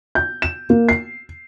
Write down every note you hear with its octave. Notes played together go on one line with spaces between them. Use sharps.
G6
E7
A#3
C7